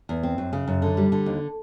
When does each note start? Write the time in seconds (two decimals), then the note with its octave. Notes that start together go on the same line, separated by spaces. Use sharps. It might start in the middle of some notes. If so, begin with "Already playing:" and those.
0.09 E2
0.23 C4
0.38 F#2
0.53 C#3
0.68 F#2
0.82 D3
0.97 G3
1.12 D3
1.26 D#2